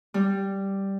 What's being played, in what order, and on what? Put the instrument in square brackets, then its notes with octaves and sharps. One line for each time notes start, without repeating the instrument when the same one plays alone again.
[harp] G3